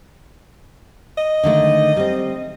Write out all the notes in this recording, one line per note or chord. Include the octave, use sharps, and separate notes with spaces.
D#5
D3 D#3 A3
G3 C4